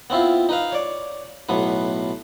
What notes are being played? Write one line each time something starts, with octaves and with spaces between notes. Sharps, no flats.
B3 C4 E4 F4
D#4 B4 F5
C#5 D5
B1 A2 B3 B4